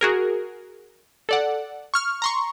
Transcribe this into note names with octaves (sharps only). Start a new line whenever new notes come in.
F#4 G#4 A#4
A4 D5 F#5
C#6 F6
A#5 C6 C#6